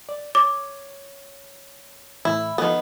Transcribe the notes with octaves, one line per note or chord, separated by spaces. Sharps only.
D5
C#5 D6
A2 E3 E4
D#3 F3 B3 A4